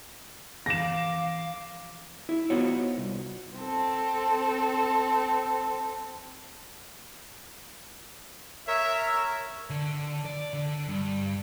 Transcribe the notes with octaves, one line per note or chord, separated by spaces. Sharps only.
E3 F3 C4 F5 D6 A#6 E7
E4
B3 D#4 F4 F#4 C5 C#5
C2
C4 A4
A#4 C#5 E5
D3
D5
D3
G2